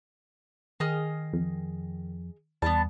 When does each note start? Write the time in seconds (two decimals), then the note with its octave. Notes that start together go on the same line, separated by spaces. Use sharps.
0.80 D#3 G#4 D#5 F6
1.33 F2
2.62 E2 G3 B3 D4 A5